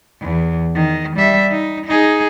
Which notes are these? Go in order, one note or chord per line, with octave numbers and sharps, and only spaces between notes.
E2
D#3
G3 E5
D#4
D#4 G#4